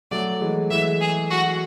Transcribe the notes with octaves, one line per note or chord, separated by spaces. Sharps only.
F#3 A3 D5
E3 G#3
E3 G#3 E5
G#4
F#4